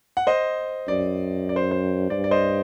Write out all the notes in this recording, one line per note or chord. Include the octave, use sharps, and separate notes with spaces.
F#5
C5 D#5
F#2 D5
D5
C5
C5
G2 D5
D5
C5 D#5